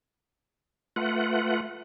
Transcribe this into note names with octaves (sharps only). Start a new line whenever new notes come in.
A3 F4 B4 F#5